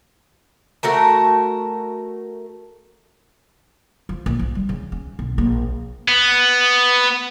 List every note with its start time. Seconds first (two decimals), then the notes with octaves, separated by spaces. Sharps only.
0.83 A3 F#4 A#4 A5
4.09 F3
4.26 A#1
4.39 F3
4.55 G3
4.69 C#3
4.92 C#4
5.19 B1
5.38 A#1
6.08 B3